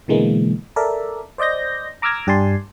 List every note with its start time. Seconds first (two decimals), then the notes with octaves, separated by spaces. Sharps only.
0.08 B2 D3 E3 G#3 A#3
0.76 A4 A#4 D5 E5
1.38 C5 D5 D#5 G6 A#6
2.02 A#5 D6 E6 F6 G#6 A#6
2.27 G2 G4 D5 G#5 A5 C6